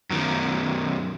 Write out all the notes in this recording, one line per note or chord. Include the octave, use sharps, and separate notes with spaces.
F#2 D#3